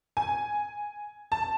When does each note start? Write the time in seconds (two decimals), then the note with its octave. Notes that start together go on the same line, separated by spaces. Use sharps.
0.17 G#5
1.32 A5